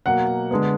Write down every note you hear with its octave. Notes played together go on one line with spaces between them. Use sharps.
B2 F#3 A#3 F#5
D3 G#3 B3